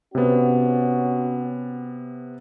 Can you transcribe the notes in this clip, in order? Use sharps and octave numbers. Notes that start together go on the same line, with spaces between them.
C3 B3 C#4 F#4